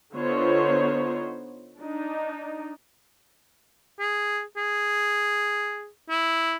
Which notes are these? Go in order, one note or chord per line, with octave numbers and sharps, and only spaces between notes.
D3 B3 D#4 F4 C5 C#5
D4 D#4
G#4
G#4
E4